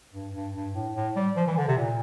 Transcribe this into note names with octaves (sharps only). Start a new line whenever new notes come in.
G2
G2
G2
A2
A2
G3
F3
E3
D3
C3
A#2